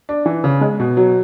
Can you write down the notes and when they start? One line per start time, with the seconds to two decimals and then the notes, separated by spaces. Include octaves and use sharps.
0.09 D4
0.26 E3
0.44 C#3
0.61 G#3
0.80 B2
0.97 F#3